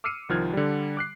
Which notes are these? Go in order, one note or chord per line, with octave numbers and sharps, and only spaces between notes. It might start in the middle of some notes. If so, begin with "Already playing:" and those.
D6 E6 F6 C7 C#7 D#7
C2 D#3 F3 F6 F#6 G#6
D3 G3
D6 F#6 C7